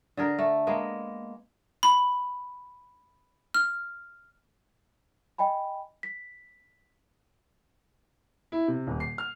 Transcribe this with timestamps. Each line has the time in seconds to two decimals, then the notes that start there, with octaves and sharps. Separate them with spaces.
0.17 D3 G#4 A#4
0.39 A3
0.67 G#3 A#3 B3
1.83 B5
3.54 F6
5.38 D#5 G5 G#5 B5
6.03 B6
8.52 E4
8.68 C3
8.87 D#1
9.00 C7
9.18 F6